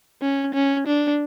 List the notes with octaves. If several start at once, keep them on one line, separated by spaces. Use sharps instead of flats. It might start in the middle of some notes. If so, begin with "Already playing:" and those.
C#4
C#4
D4